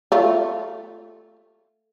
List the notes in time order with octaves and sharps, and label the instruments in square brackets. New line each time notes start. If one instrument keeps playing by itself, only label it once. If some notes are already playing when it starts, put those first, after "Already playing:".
[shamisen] A3 F4